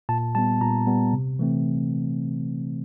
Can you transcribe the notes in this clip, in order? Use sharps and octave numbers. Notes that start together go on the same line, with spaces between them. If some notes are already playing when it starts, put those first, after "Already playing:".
A#2 A5
G3 B3 A5
A#2 A#5
G3 B3
C3
E3 A3 C4